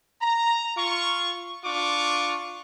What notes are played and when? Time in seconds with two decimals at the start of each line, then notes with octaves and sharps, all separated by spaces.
0.22 A#5
0.76 F4 C#6
1.65 D4 F4 C#6 D6